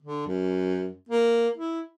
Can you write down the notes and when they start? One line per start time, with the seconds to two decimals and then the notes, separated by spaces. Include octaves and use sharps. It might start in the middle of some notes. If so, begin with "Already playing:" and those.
0.03 D3
0.27 F#2
1.09 A#3
1.57 E4